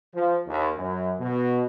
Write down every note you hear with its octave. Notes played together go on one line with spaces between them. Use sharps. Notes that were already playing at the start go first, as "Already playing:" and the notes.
F3
D#2
F#2
B2